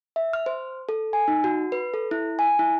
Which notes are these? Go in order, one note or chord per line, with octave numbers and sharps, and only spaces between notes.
E5
F6
C5
A4
G#5
D#4
F#4
B4
A4
E4
G#5
E4